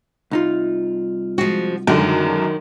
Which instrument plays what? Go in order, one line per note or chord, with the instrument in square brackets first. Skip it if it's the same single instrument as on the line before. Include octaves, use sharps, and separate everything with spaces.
[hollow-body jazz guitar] C2 D#4 F4
[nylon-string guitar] F3 G#3 F#4
[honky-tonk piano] F#2 D3 G#3 [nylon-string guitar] D#3